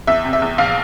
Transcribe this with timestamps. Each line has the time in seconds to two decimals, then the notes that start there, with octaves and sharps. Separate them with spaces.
0.07 E2 E5
0.24 C3
0.33 E5
0.42 E2
0.58 A#1 F5